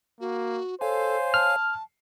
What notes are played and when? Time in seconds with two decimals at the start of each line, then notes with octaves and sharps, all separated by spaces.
0.21 A#3 F#4
0.81 A4 C5 C#5 F5 G#5
1.34 A5 F6